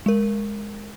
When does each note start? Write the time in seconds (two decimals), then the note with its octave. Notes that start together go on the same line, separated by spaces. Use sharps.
0.06 G#3 A#4